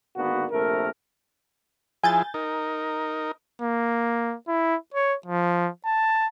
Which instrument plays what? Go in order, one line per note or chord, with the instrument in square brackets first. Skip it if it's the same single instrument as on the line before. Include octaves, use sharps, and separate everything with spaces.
[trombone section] G#1 D3 A#3 B3 F#4
A#1 C3 A3 A#4
[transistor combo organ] F3 E4 G#4 [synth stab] G#5 G6 A6
[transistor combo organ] D#4 A#4
[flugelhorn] A#3
E4
C#5
F3
A5